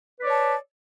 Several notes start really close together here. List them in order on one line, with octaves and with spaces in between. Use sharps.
B4 D5 C#5 A5